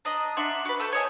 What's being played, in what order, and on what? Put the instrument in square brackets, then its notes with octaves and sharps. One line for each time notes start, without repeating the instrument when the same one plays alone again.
[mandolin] D4 D#5 A#5
D4 E5 F#5 C6
F#4 B4
A3 A4 G6
C#5 D#5 G#5